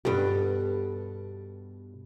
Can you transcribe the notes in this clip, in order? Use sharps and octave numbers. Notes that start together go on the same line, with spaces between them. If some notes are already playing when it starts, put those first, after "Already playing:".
G2 B2 B3 G4 A4